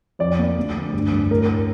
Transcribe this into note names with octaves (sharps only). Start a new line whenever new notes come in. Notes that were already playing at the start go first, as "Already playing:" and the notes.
F2 D5
A#3
D2
D2
G2
G2
A2 A#4
A2